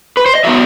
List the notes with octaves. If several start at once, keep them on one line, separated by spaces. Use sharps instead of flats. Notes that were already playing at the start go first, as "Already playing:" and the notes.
B4
C5
D#5
F#3 B3 D#4 E5